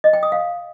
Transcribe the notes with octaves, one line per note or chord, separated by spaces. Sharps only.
D#5
G5
D#6
F5